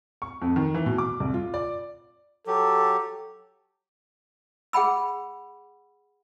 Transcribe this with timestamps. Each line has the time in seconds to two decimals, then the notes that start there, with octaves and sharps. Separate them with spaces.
0.22 C#6
0.42 F2
0.56 D#3
0.74 E3
0.86 B2
0.98 D6
1.20 C2
1.34 F4
1.54 D5
2.47 F#3 G4 A4
4.73 G#4 F#5 G5 B5 E6